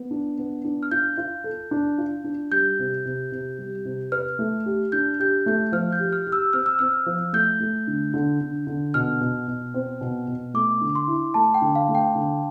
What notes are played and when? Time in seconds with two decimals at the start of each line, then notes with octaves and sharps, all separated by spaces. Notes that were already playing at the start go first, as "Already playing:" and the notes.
Already playing: B3
0.11 D4
0.38 B3
0.64 D4
0.83 F6
0.91 F4 G6
1.17 F4
1.44 A4
1.71 D4
1.98 F4
2.24 D4
2.51 G3 G6
2.79 C3
3.05 C3
3.32 C3
3.59 G3
3.85 C3
4.12 B4 F6
4.39 A3
4.66 G4
4.92 D4 G6
5.20 G4 G6
5.46 A3 G6
5.72 F3 F6
5.92 G6
5.99 G4
6.13 F6
6.27 G4
6.32 E6
6.53 C4 F6
6.66 E6
6.79 C4 F6
7.06 F3
7.33 A3 G6
7.60 A3
7.87 D3
8.14 D3
8.41 D3
8.67 D3
8.94 B2 F6
9.21 B2
9.48 B2
9.74 C4
10.01 B2
10.28 B2
10.54 A3 D6
10.81 D3
10.95 C6
11.08 E4
11.34 A3 A5
11.54 G5
11.62 D3
11.75 F5
11.88 A3
11.95 G5
12.15 D3